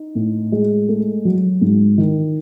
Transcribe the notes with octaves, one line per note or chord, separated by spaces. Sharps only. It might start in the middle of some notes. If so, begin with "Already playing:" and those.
Already playing: D#4
A2
G#3
A3
F#3
G#2
D#3